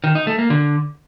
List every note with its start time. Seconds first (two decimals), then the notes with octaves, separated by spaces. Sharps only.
0.04 D#3
0.15 D#4
0.27 A3
0.39 A#3
0.50 D3